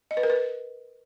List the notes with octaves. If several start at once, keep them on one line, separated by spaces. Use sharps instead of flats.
D#5
B4
A#4
B4